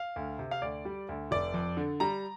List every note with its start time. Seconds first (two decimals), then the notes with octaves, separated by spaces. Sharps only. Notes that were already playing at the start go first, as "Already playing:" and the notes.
Already playing: F5
0.16 D2
0.39 C3
0.51 F5
0.62 D2 D5
0.85 G3
1.09 D2
1.31 F1 D5
1.54 F2
1.77 D3
2.00 G3 A#5